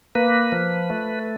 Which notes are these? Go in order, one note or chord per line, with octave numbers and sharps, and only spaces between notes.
A#3 B4
F3
A3